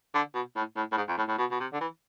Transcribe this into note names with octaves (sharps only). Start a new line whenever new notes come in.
D3
B2
A2
A2
A2
G#2
F2
A2
A2
B2
B2
C3
D3
E3